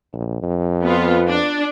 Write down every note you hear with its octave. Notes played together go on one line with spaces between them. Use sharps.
A#1
F2
B3 F4
D4